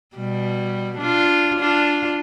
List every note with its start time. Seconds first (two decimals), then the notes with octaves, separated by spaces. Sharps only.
0.16 B2 G3
0.98 D4 F4
1.59 D4 F4